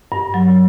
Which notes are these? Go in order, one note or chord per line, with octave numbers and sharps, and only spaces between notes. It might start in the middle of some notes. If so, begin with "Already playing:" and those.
G2
F#3